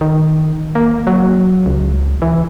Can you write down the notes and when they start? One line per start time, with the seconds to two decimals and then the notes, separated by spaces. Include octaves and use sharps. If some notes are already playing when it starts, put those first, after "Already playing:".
0.01 D#3
0.75 A#3
1.07 F#3
1.66 C#2
2.22 E3